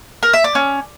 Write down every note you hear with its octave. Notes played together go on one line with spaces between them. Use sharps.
A#4
E5
D5
C#4